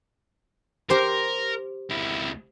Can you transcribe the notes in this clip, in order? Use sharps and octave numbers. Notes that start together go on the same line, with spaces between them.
G4 A#4 C5
C#2 E4